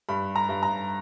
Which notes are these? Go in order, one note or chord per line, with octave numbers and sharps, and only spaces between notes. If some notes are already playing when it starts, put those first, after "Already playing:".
G2 B5
A#5
G2
A#5